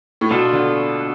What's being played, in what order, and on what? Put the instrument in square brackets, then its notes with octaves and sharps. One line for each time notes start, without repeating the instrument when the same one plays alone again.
[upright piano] A2
[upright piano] B2 [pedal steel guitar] B3 D4 F4 A4
[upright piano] D3